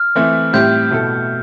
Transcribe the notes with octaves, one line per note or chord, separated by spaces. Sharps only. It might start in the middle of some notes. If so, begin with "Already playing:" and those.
Already playing: F6
E3 A3 C4 E4
A2 G3 C4 E4 G4 G6
B2 A3 E4 A4